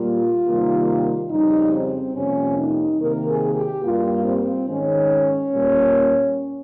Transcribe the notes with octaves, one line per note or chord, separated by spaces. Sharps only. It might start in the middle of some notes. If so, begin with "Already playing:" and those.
Already playing: A#2 G3 A#3 F4
C3 D#3 G3 A#3
F2 C#3 G3 D#4
C4
F2 C3 G3 A#3 C#4
D#4
C3 D#3 A#3 A#4
G#4
G4
G2 G3 A#3 F4
C4
G#2 D#3 G#3 C#4
A#2 G3 A#3